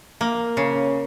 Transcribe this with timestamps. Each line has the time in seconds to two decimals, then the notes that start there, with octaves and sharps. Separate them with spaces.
0.21 A#3
0.57 C#3